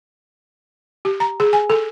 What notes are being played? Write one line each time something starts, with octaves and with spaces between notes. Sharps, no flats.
G4
A#5
G#4
G#5
A4